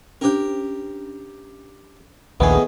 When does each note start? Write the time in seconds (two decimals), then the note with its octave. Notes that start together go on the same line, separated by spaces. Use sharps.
0.21 C#4 D4 G4 A#4 C5
2.40 A#1 D#2 A2 D#3 B3 G#4